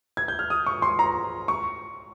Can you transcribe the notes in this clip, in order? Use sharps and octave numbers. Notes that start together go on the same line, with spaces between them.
G#6
G6
F6
D#6
C#6
C6
A#5
C#6